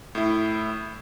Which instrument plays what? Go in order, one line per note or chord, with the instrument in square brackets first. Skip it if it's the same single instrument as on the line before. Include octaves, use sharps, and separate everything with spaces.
[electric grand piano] A2 E4